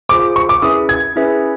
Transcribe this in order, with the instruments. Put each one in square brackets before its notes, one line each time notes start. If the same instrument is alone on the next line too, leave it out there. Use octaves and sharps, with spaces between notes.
[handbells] F4 G#4 C5 [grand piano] D6
[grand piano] C#6
D6
[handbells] C#4 E4 G#4 B4 E5 [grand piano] D#6
[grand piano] G#6
[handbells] C#4 E4 G#4 B4 E5